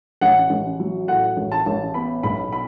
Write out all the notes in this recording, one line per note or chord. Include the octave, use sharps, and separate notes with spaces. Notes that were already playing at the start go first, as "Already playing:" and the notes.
A1 F#5
A1
F#3
A2 F#5
A1
A5
A1
B3 B5
B1 B5
B5